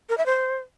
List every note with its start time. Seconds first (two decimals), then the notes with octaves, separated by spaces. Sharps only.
0.09 A#4
0.18 E5
0.26 C5